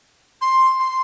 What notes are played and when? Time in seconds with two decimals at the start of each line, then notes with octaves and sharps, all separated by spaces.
0.41 C6
0.80 C6